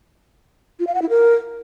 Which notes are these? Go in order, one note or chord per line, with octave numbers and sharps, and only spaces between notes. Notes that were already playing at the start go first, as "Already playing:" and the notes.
F4
F5
F#5
E4
A#4